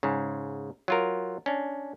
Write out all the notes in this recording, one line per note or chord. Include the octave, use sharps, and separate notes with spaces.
G#2 C#3
F#3 F4 A#4
C#4 D4